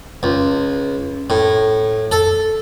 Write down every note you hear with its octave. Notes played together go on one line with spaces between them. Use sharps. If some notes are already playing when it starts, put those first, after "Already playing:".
C#2
A2
A4